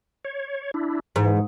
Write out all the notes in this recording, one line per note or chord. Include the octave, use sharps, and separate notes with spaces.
C#5
D4 E4
G#2 E3